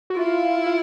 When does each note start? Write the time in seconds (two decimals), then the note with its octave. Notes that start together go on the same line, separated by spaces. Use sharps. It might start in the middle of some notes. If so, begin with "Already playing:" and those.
0.10 F#4
0.16 E4 F4
0.66 F4